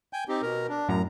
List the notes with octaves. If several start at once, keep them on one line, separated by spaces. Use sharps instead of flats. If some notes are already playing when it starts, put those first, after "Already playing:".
G5 G#5 G6
C4 D#4 G4
B2 A#4 A#5
D4
F#2 A2 A#5